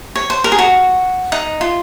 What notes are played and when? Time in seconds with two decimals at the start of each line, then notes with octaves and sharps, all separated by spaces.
0.16 C#5
0.30 C5
0.44 A#4
0.52 G#4
0.58 F#4
1.32 D#4
1.61 F4